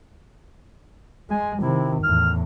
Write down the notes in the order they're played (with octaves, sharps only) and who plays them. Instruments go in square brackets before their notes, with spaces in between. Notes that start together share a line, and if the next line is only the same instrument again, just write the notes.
[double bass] G#3 [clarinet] G#5
[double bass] C3 D#3 [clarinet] E4
[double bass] E2 A2 [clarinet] F6